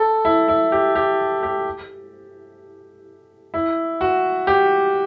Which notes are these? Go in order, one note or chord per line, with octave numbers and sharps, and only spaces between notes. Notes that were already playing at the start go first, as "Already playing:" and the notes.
Already playing: A4
E4
E4
G4
G4
G4
E4
F#4
G4